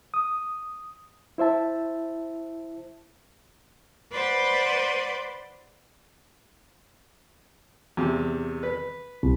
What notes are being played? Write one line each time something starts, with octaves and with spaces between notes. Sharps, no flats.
D#6
E4 C5 E5 A5
B4 C5 D5 F#5 C6
E2 C3
B4
C2